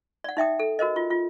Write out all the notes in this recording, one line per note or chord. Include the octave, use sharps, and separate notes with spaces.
D5 F#5
D#4 E5 G5 D#6
A4
F#4 A#4 C5 D#5
F4
F4